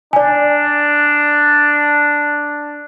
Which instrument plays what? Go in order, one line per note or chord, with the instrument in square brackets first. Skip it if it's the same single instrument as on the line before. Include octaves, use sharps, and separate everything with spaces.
[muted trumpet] D4 [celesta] D5 G#5